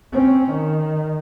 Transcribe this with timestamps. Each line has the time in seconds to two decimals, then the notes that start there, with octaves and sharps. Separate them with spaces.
0.12 C4 C#4
0.51 D#3